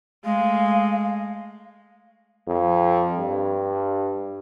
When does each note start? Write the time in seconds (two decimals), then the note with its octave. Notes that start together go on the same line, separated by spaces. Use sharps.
0.25 G#3 A3 F5
2.47 F2
3.18 G2